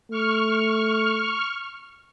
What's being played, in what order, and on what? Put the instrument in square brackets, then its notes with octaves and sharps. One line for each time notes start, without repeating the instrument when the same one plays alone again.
[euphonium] A3 [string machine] C#6 F6